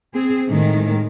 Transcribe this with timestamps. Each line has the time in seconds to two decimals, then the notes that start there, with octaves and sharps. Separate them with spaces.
0.14 C4 G#4
0.47 A2 D#3 G#3